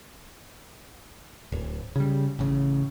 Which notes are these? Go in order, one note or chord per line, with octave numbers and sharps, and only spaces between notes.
D1
C#3 G3
A1 C#3